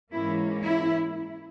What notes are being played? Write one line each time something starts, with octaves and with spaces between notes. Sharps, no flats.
G#2 E3 A#3 C#4 E4
E4